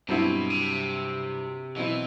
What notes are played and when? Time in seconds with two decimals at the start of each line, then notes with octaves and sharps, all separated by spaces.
0.08 G2 B2 F#3 C4 E4
0.50 C3
1.76 B2 E3 F#3 C4 E4